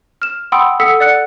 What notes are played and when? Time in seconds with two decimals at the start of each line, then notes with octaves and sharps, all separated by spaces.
0.22 F6 E7
0.52 F#5 G5 B5 C6 D#6 E6
0.80 A4 F#5 D#6 E6 B6 C#7
1.00 D5 F#5 F#6 C#7